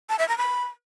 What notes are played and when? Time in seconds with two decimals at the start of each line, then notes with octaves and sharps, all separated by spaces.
0.09 A5
0.19 E5
0.29 A#5
0.38 B5